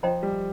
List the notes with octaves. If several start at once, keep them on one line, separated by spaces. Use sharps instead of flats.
F3 C5 D#5 G5 A#5
G3